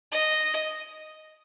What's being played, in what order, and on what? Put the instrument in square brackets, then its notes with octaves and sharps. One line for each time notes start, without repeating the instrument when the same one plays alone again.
[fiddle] D#5